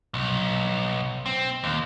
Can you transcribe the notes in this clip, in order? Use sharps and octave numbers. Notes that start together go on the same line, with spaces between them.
B1
C4
D#2